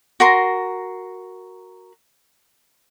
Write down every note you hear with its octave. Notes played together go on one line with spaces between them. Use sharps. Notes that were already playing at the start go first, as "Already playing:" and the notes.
F#4 A#4 C6